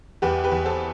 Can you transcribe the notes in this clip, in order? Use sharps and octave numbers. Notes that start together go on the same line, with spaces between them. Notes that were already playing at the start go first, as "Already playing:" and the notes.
E2 G4 B4
G4 B4
E2
A4 C5